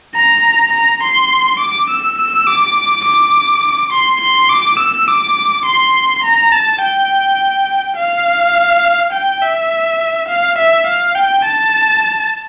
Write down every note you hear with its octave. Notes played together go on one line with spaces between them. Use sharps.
A#5
A#5
C6
D6
E6
E6
D6
D6
C6
C6
D6
E6
D6
C6
A#5
A5
G5
F5
G5
E5
F5
E5
F5
G5
A5